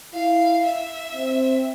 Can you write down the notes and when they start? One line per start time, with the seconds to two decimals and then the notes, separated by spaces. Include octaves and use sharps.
0.14 E4 F5
0.64 E5
1.15 C4